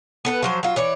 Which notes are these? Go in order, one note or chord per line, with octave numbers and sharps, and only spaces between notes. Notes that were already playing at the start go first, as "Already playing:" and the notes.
B3 A4 B4
F3 F#3 C5
F#3 F4
E3 C#5 D5